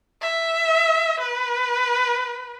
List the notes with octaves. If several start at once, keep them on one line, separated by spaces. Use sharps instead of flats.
E5
B4